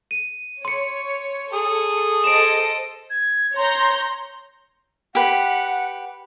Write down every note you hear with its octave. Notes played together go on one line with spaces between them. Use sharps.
D#7
C#5 C6 C#7
G#4 A4 D#6
A4 C5 D#5 D7 E7
G#6
C#5 A#5 C6 G6
G4 B4 F#5